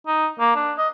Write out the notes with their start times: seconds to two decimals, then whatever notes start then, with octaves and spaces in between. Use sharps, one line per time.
0.07 D#4
0.40 A#3
0.56 D4
0.78 D#5